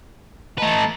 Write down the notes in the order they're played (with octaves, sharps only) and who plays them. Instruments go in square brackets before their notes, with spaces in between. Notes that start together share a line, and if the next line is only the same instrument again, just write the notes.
[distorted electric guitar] A3 B4 [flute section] D#5 A5 A#5